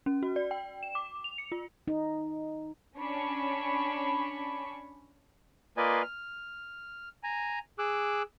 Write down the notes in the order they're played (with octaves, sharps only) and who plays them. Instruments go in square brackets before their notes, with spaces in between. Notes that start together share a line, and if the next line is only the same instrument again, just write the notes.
[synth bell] C#4
F#4
D5
G5
E7
D6
F7
C#7
F4
[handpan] D#4
[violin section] C#4 D4 C#5 B5 C#6
[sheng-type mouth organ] A#3 F4 B4 D5 D#5 G#5
F6
G#5 A#5
G#4 D6 E6 F#6